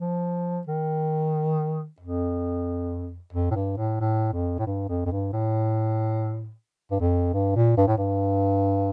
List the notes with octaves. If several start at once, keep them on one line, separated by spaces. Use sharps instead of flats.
F3
D#3
F2
F2
A2
G2
A2
A2
F2
A2
G2
F2
F2
G2
A2
G2
F2
G2
A#2
G2
A2
G2